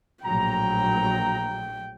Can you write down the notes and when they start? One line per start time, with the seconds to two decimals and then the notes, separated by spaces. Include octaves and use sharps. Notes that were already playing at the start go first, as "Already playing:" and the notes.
0.24 A#1 A2 F#3 G5 A#5